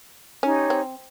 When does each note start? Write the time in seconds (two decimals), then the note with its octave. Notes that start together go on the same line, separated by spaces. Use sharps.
0.43 C#4 D#4 G4 C#5 G#5
0.70 C4